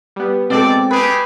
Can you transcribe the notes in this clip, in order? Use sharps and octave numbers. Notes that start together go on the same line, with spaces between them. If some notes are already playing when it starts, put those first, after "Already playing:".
G3 B3
B2 G#3 C4 A4 D5
A3 G4 G#4 B4